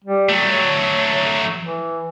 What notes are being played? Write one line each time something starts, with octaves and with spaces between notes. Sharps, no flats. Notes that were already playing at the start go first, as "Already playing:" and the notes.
G3
F#3 A3
C#5
E3